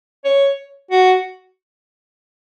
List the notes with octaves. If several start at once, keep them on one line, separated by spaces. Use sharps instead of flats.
C#5
F#4